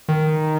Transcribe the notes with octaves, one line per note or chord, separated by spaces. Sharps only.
D#3